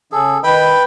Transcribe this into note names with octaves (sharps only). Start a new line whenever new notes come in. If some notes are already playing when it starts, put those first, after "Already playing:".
C#3 G#4 A4
D#3 B4 D#5 G5 B5